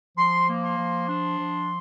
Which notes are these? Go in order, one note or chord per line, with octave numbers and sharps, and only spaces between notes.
F3 C6
A#3
C6
F3
D4
F3